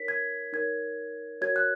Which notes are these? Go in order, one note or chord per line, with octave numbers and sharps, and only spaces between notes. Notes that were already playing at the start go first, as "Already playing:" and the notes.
Already playing: D#4 A#4 C#5 B6
G#6
D#4 A#4 C#5 G#6
F#4 A#4 C#5 G#6
F#6